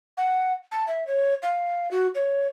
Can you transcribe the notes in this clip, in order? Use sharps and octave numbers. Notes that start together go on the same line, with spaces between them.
F#5
A5
E5
C#5
F5
F#4
C#5